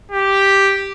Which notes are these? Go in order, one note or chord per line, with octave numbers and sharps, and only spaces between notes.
G4